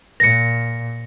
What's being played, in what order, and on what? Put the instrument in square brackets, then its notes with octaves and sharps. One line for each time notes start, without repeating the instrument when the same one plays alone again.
[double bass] A#2 [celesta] A#6 C#7